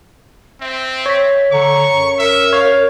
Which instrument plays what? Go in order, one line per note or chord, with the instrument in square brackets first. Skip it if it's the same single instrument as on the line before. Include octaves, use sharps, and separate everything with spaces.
[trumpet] C4 [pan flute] E5
[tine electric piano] C#5 B6
[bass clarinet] D3 [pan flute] A#5 [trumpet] C#6
[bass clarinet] F#2
[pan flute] A#4 [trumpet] E5
[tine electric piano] C#5 [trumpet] F5